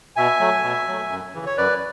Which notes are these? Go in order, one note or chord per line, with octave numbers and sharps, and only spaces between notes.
B2 E5 G#5
F#3 A3
B2
F#3 A3
F#2
C#3 E3
C#5
F#2 B4 D5